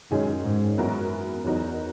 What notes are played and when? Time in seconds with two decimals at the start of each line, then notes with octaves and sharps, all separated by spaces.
0.11 F#2 D#3 G#3 C#4 G#4
0.44 G#2
0.77 F#2 E3 B3 F#4 A#4
1.44 E2 F#3 B3 D#4 F#4 A#4